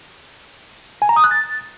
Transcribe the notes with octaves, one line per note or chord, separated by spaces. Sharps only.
G#5
A#5
D#6
F#6
A6